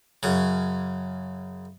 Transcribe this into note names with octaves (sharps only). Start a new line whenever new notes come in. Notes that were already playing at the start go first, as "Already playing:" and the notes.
F#2 C#3